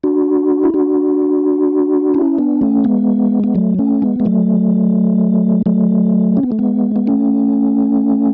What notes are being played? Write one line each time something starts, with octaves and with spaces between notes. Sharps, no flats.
D4 F#4
E4
D4 F#4
C#4 E4
B3 D4
A3 C#4
G#3 B3
B3
F#3 A3
A3 C#4
G#3 B3
G#3
F#3 A3
F#3 A3
C#4
B3
A3
G#3 B3
B3
A3 C#4